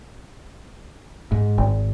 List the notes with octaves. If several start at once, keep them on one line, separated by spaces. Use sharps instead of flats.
G#2
G#1